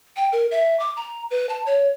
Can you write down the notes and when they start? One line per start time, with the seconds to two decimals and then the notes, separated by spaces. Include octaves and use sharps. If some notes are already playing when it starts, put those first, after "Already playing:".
0.16 G5
0.32 A#4
0.51 E5
0.80 D6
0.97 A#5
1.31 B4
1.49 A5
1.66 C#5